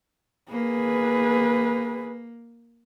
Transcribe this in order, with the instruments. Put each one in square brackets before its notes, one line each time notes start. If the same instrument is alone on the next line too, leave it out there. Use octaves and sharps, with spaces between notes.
[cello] A#3 [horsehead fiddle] G#4 B4